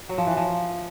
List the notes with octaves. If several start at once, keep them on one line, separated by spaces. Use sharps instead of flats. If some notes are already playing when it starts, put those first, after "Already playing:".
F#3
F3
E3
F3